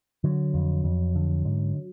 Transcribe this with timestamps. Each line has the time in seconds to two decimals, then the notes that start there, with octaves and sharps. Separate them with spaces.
0.24 D3 F#3
0.54 F2
0.84 F2
1.16 D3
1.45 G#2